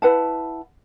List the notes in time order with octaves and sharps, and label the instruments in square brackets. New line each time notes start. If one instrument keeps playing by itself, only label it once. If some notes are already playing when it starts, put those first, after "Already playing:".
[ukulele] E4 B4 F#5 A5